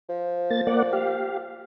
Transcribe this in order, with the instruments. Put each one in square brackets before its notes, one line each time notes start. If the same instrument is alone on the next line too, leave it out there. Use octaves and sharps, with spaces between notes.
[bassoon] F3
[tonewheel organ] A#3 A6
A#3 D5 F#5
G4 F5